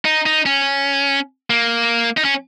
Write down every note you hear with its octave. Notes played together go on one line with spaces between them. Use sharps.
D#4
D#4
C#4
A#3
D#4
C#4